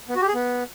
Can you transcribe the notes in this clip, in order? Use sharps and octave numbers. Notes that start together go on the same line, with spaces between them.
B3
F#4
G4
G#4
B3